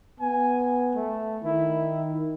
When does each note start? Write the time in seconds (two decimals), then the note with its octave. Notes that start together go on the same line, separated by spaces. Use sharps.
0.20 B3 G#5
0.95 A3
1.44 D#3 E4